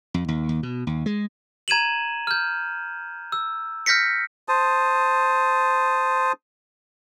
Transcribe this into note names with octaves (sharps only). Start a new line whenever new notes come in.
F2
D#2
D#2
B2
D#2
G#3
A#5 G#6 D#7 E7 F#7
F6 G6
E6
F6 G6 A#6 B6 C#7
C5 A5 D#6